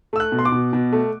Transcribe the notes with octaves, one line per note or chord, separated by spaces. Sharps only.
A3 E6
F#6
B2
C6
D6
B2
B2
A3